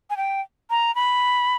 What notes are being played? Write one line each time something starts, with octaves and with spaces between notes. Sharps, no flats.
G#5
G5
A#5
B5